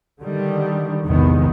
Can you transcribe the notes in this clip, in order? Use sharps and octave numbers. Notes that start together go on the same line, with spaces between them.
D3 D#3 G3
A#1 E2 G#2 C3 D#3 B3